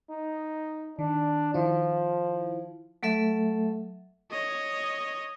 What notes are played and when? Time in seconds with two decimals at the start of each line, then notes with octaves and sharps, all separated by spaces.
0.10 D#4
0.99 D#3 D4
1.54 D#3 F3 E4
3.03 F#3 A3 A4 E5
4.31 C#5 D#5